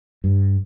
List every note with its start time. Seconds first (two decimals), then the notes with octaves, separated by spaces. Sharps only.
0.24 G2